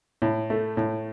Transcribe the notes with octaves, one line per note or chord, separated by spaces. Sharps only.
A2
A3
A2